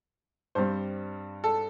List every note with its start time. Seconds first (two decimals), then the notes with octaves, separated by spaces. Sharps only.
0.55 G2 G3 C4 C5
1.44 A4